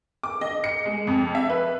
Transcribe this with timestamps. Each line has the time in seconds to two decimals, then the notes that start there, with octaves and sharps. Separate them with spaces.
0.23 D6
0.41 D#5
0.64 C#7
0.86 G#3
1.07 F2
1.35 E5
1.49 B4